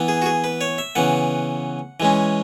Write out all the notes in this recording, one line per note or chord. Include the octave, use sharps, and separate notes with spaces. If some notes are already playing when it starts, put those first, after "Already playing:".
Already playing: E3 B3
G#4
F#4
G#4
B4
C#5
E5
C#3 E3 B3 F#5
E3 G#3 C#4